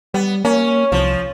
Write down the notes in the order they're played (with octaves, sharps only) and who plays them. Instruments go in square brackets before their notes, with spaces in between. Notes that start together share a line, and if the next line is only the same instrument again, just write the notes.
[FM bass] G3 [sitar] B3
[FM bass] A#3 [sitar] C#4
[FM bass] C2 [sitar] F3